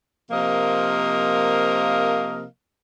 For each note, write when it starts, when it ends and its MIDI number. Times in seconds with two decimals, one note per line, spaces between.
0.31 2.44 48
0.31 2.44 53
0.31 2.44 58
0.31 2.44 70
0.31 2.44 75
0.31 2.44 77